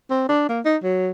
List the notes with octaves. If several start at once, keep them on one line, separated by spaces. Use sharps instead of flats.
C4
D4
A#3
D#4
F#3